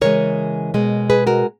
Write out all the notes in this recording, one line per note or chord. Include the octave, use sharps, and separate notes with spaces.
C#3 E3 G#3 A#4 C#5
B2 G#3
G#4 B4
F#4 A#4